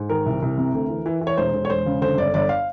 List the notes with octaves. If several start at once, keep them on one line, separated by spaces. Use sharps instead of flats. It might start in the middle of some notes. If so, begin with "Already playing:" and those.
Already playing: G#2
D#3 A#4
C2
C2
C3
D2
E3
E3
E3
C#5
E1 C5
E1
C#5
E1 C5
C#3
D3 C5
G1 D5
G1 D5
F5